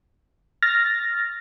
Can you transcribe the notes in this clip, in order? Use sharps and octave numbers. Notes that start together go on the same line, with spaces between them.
F6 A6 A#6